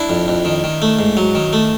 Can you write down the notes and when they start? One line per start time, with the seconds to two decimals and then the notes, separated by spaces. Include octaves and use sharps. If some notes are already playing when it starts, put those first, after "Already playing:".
Already playing: D4 E4
0.09 F2
0.28 F2
0.45 D#3
0.64 D#3
0.82 A3
0.99 G#2
1.17 F#3
1.35 D#3
1.53 A3